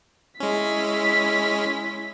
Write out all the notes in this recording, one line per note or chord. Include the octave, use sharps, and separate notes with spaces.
G#3 C#4 E4 B6